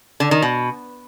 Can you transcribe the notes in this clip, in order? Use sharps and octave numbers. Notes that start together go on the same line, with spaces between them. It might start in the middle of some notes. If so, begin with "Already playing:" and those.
D3
D#3
B2